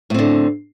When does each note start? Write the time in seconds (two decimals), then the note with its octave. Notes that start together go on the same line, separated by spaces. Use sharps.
0.10 A2
0.14 C4
0.19 D3